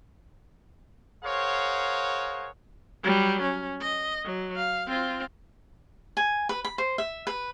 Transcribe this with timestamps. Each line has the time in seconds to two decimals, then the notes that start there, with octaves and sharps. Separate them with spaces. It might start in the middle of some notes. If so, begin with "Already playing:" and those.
1.23 G#4 A#4 C5 C#5 F5 F#5
3.03 F#3 G3
3.42 C#4
3.80 D#5
4.25 F#3
4.56 F5
4.87 C4 F4
6.17 G#5
6.49 B4
6.65 B5
6.78 C5
6.98 E5
7.27 B4